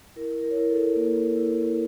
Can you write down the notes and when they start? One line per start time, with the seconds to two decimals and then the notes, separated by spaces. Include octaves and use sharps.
0.16 E4 A#4
0.42 A#4
0.51 C#5
0.56 E4 A#4
0.70 A4
0.96 A#3
1.37 E4